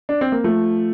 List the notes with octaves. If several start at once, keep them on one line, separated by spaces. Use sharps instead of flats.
D4
C4
A#3
F3 A3